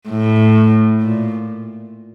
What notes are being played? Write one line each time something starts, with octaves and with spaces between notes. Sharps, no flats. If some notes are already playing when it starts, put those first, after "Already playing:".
A2
A#2